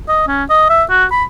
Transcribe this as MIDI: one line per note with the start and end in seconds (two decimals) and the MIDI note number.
0.08 0.26 75
0.27 0.44 61
0.49 0.66 75
0.69 0.83 76
0.90 1.05 66
1.11 1.24 83